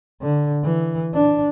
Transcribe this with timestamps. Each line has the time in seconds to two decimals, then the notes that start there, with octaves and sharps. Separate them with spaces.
0.21 D3
0.64 E3
1.14 D4